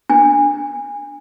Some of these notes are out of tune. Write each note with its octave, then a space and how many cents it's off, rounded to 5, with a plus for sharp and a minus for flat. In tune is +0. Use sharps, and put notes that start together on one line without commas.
D4 +0 G#5 -25